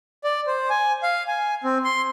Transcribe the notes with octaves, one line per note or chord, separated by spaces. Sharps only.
D5
C5
G#5
F5
G#5
C4
C6